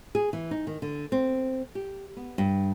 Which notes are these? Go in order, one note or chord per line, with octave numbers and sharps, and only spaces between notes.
G#4
E3
D#4
D#3
D3
C4
G4
B3
G2